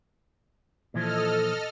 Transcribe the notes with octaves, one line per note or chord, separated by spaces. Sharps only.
A#2 E3 F3 A4 D#5 F6